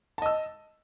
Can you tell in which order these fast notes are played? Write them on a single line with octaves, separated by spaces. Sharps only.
A5 D#5 E6